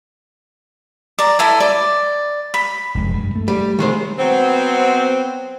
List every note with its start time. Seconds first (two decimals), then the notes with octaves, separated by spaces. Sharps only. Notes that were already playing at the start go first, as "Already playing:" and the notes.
1.19 D5 A#5
1.39 E4 A4 G#5
1.60 D5
2.54 B5
2.95 F1 G#3
3.13 G2
3.35 A3
3.48 G3
3.79 D#3 G#3 C5
4.19 F#3 B3 C4